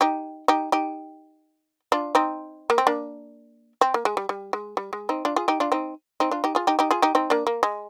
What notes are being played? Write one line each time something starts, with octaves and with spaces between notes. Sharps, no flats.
D#4 G4
D#4 G4
D#4 G4
D4 F4
C4 D#4
A#3
C4
A#3 D4
C4
A#3
G#3
G3
G3
G#3
G3
G#3
C4 D#4
D4 F4
F4 G#4
D#4 G4
D4 F4
C4 D#4
C4 D#4
D4 F4
D#4 G4
F4 G#4
D#4 G4
D#4 G4
F4 G#4
D#4 G4
C4 D#4
A#3 D4
A#3
G#3